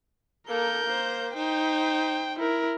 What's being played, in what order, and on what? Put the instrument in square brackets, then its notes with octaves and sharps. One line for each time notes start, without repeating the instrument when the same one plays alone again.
[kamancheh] A#3 A4 [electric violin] A#4 G6
[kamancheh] A#3 C5
[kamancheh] D#4 C5 [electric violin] G5
[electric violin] E4 A#4